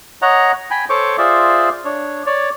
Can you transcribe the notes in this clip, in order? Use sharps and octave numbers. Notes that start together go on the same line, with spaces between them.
C#5 D#5 F#5 A#5
G5 G#5 B5
A4 C5 C#5 C#6 D6
F4 G#4 C5 D5 E5
D4 C#5
C#5 D5